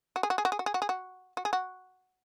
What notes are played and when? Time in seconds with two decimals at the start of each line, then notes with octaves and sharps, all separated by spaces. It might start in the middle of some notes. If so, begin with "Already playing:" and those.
0.16 F#4
0.23 G#4
0.30 F#4
0.38 G#4
0.45 F#4
0.52 G#4
0.59 F#4
0.66 G#4
0.74 F#4
0.82 G#4
0.89 F#4
1.37 F#4
1.45 G#4
1.53 F#4